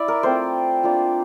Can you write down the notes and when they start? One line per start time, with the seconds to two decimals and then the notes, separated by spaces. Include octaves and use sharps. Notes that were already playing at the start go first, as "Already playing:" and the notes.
Already playing: E4 D5 E5
0.08 A#4
0.23 A3 C4 F4 C5
0.83 A#3 D4 F4